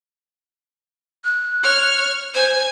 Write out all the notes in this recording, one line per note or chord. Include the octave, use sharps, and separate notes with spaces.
F#6
C#5 F6
C5 G#5